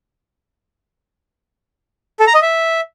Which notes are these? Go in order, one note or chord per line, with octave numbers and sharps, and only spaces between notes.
A4
A#5
D#5
E5